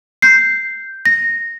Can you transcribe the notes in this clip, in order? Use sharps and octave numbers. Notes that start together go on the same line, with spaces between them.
G6 C7
A#6